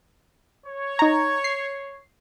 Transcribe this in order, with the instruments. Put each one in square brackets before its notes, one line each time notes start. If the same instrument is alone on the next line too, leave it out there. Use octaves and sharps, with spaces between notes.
[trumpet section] C#5
[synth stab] D#4 A#5
C7